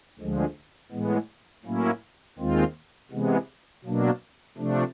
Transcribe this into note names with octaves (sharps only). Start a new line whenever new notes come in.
D2 D3 F3 G#3
A2 E3 G#3 B3
A2 F#3 A#3 C#4 E4
D#2 D#3 G#3 C4 F4
C3 E3 G#3 B3
B2 F#3 A#3 D4
C3 F3 A3 D4